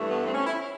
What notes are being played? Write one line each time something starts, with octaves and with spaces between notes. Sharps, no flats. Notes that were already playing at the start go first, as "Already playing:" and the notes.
Already playing: G2 E3 A3
B3
C4
C#4
E4